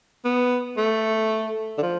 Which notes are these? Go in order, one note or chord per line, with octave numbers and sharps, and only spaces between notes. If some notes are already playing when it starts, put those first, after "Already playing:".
B3
A3
D3
F3